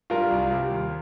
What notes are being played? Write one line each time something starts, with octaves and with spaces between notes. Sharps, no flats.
G2 G3 F4 A#4
C2
C3 G3
D#2